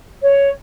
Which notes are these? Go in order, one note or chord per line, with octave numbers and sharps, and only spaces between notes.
C#5